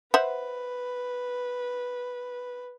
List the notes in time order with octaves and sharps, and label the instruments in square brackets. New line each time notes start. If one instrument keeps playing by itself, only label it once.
[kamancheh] B4 [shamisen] C5 E5 F#5